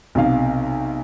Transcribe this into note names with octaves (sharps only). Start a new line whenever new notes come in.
B1 C3 F5